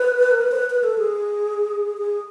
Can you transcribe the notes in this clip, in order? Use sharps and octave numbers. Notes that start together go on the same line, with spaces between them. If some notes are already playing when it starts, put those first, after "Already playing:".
Already playing: B4
A#4
B4
C5
B4
B4
A4
G#4
G#4